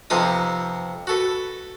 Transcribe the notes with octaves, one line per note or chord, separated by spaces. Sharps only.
F2 C3 F3 B3 D#4 D#6
F#4 A4 B4